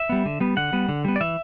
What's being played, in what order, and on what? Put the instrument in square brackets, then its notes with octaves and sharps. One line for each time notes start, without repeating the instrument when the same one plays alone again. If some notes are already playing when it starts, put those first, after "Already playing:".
Already playing: [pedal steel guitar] E5
G3 B3
D3
G3 B3
D3 F#5
G3 B3
D3
G3 B3
D5
E3 E5